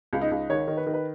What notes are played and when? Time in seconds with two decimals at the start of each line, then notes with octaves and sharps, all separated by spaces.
0.13 C#2
0.21 D#4
0.31 C#2
0.50 D#3 C#5
0.68 D#3
0.77 B4
0.87 D#3
0.94 B4